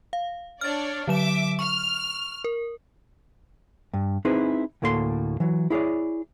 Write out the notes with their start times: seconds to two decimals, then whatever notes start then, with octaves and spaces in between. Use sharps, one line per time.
0.13 F5
0.61 D4 C#5 D5 F6 A6
1.08 D3 F#3 E5 D6 E7
1.59 C#6 F6
2.44 A#4
3.93 G2
4.25 C4 D#4 E4 G#4 B4
4.82 D2 A2 A#3 A4 C#5 C6
5.40 E3 F#3
5.70 E4 G#4 C#5 D5